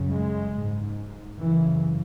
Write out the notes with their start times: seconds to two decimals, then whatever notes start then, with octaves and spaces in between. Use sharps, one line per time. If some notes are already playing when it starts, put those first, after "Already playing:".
Already playing: F#2 C#3
0.09 G#3
0.53 G#2
1.39 F#2 C#3 E3